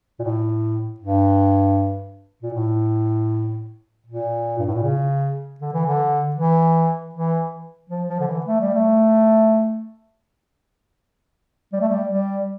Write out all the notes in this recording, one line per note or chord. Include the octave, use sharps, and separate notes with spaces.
A#2
A2
G2
A#2
A2
A#2
G2
A2
A#2
C#3
D3
E3
D3
E3
E3
F3
F3
D3
E3
A3
G3
A3
G3
A3
G3
G3